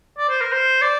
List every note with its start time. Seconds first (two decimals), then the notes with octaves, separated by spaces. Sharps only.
0.18 D5
0.29 C5
0.41 A#4
0.52 C5
0.82 D5